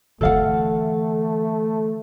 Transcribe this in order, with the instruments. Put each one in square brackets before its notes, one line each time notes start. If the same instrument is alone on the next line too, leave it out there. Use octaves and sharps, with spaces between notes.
[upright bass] D3 E3 [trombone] A3 [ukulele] A4 F5 F#5